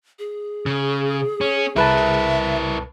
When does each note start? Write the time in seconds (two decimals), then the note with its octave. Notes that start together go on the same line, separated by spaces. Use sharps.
0.19 G#4
0.66 C#3
1.41 C#4
1.76 C2 E4 A#4 B4 E5 A5